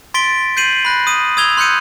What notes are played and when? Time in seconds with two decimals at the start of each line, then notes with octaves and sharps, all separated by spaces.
0.14 C6 A6 B6 D7 G7
0.57 G6 C7 D#7 F#7
0.85 B5 F#6 A#6
1.07 D#6 D#7
1.37 D#6 E6 G#6 F7 G7
1.57 C6 F#6 G6 C#7 D#7